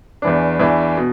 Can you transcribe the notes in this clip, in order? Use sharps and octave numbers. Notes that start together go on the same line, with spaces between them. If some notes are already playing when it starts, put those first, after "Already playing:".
E2 E3 D4
E2 E3 D4
B2